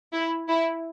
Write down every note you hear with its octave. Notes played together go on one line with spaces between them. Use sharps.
E4
E4